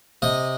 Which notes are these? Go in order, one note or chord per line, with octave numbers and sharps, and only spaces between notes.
C3 D#5